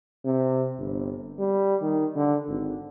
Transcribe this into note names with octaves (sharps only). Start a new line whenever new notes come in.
C3
G1
G3
D#3
D3
G#1